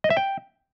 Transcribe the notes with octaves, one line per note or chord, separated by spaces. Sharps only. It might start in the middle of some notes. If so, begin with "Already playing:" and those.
D#5
E5
G5